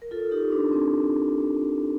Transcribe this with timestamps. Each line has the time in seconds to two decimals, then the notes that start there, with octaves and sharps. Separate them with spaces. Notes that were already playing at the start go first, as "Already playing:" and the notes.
0.02 A#4
0.11 F4 A4
0.31 D#4 G4
0.52 D4
0.72 C4